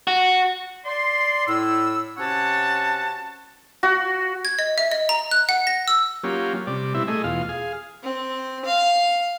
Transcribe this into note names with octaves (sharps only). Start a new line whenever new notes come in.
F#4
D5 C6
A2 E6
C3 C#4 F#4 C#5 F#5 A5
F#4
G#6
D#5
E5
D#5
A#5
F#6
F#5
A#6
E6
F#3 A#3 C#4 F4 G4
C3 G3 D5
B2 G3 C4 E4 E5
A3 G#4 D#5 E5
E2 B2 F4 F5
G#4 F5
C4
F5